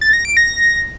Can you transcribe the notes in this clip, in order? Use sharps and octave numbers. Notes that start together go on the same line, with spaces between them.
A6
A#6
D7
A#6